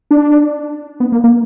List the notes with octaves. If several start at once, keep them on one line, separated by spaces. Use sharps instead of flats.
D4
B3
A#3
A#3